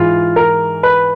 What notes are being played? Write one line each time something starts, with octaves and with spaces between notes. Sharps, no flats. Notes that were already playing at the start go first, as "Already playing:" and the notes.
Already playing: G#2 E3 F4
A#4
B4